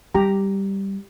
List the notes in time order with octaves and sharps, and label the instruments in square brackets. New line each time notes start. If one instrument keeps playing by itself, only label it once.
[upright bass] G3 [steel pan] G4 A#5